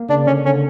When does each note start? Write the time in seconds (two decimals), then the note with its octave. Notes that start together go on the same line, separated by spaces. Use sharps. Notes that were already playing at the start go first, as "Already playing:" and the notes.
Already playing: A#3
0.09 C#3 D4
0.27 D3 C#4
0.45 D3 C#4